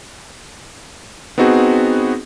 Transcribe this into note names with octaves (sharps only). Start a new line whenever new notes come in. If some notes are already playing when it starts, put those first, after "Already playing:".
B3 C4 D#4 F#4 G#4